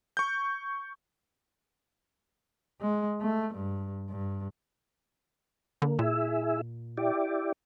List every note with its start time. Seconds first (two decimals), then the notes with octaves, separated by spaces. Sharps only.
0.17 C#6 G6
2.81 G#3
3.21 A3
3.54 G2
4.09 G2
5.82 D3 A#3
5.99 A#2 E4 G#4 E5
6.97 E4 G4 D5